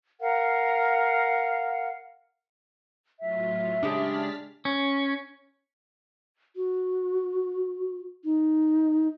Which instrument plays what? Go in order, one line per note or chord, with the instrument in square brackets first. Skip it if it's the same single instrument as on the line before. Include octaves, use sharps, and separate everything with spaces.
[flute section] A#4 F5 F#5
[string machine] A2 F#3 F4 [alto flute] E5
[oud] C#3 G#3 G4 [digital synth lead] D4 [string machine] F6 A6 B6
[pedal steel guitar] C#4
[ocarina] F#4
D#4